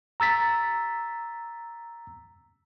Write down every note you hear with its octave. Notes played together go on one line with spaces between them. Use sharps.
A#5 E6 A6 B6